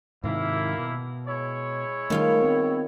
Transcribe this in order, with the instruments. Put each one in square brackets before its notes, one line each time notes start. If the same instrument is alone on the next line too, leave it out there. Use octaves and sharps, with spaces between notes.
[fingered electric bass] G#2 C3 D#3 [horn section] A#3 E4
[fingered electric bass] B2
[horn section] G#3 E4 C#5
[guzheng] D#3 F4 F5 [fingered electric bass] G3 A3
[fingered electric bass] B3 C4